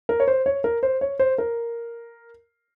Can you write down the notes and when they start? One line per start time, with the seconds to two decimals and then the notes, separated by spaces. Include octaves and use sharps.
0.09 A#4
0.20 C#5
0.28 C5
0.46 C#5
0.64 A#4
0.83 C5
1.01 C#5
1.19 C5
1.38 A#4